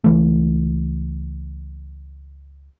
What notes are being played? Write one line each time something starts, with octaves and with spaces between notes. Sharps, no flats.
C#2 E3 A3